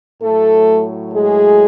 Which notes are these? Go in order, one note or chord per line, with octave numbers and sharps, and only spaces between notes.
A2 F#3 A3 A4
G#3 G#4